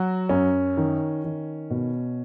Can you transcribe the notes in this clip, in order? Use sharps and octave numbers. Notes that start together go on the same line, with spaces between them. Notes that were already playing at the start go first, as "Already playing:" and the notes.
Already playing: F#3 F#4
F#2 C#4
D#3
D#3
B2